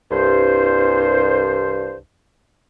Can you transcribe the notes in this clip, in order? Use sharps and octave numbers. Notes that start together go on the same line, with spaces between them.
C2 G2 C5